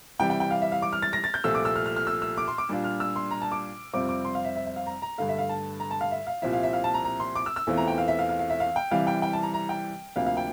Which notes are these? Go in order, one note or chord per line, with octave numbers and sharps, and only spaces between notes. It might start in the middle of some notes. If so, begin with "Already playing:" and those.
C3 E3 G3 G5
G5
G5
F5
E5
F5
D6
F6
A6
A#6
A6
G6
C2 A#2 F3 A3 E6
D6
E6
F6
F6
F6
E6
E6
D6
C6
D6
A#2 G3 D4 F4
F6
E6
C6
A#5
A5
D6
F2 C3 G3 C4 F4 D6
D6
C6
F5
E5
E5
E5
F5
A#5
A#5
G2 D3 A3 F5
E5
F5
A5
A#5
A5
F5
E5
F5
C2 A#2 F3 C4 E4 E5
F5
E5
F5
A5
A#5
A#5
C6
D6
E6
E6
E2 E3 A3 C4 F4
A#5
G5
F5
E5
F5
F5
F5
E5
F5
G5
C3 E3 G3 F5
G5
G5
A5
A#5
A#5
G5
D2 C3 F3 A#3 F5
F5
G5